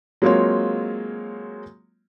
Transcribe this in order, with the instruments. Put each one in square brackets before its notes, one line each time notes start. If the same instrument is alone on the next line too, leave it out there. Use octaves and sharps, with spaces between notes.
[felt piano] F#3 G#3 A#3 C4 F4 C#5